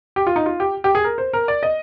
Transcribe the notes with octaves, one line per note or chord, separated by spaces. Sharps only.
G4
F4
D#4
F4
G4
G4
G#4
A#4
C5
A#4
D5
D#5